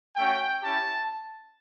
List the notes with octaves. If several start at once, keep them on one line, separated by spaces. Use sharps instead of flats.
A3 C#4 F#4 G5
C#4 E4 G4 A5